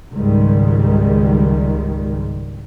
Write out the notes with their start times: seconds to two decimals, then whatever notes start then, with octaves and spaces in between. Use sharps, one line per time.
0.13 C#2 G#2 D#3 G3 G#3